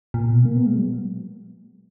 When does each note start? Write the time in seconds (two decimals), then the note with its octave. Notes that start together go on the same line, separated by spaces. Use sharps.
0.14 A#2
0.30 B2
0.45 A#3
0.56 B3
0.66 G#3
0.77 F#3